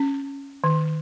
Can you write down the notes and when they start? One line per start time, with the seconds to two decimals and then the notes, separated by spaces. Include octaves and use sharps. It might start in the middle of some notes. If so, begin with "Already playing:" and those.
Already playing: C#4
0.64 D#3